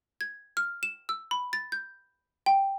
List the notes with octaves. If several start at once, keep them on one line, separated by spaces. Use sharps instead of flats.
G#6
F6
E7
E6
B5
A6
G6
G5